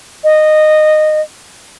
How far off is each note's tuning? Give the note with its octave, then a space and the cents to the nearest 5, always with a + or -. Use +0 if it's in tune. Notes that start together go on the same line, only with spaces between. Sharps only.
D#5 -15